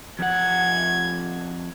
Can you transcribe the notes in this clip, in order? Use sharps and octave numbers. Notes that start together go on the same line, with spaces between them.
F2 F#5 G#6